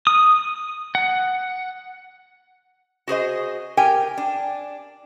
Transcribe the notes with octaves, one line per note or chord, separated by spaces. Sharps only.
D#6
F#5
F#4 G#4 C5 D#5
G4 A#4 G5 G#5
D4